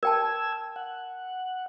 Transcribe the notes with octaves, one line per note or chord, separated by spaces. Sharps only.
A#4 G5 A5 E6 G#6
F#5